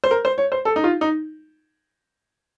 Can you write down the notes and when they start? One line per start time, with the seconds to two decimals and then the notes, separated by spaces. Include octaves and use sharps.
0.04 C5
0.11 A#4
0.25 C5
0.38 C#5
0.52 C5
0.65 A4
0.76 D#4
0.84 F4
1.01 D#4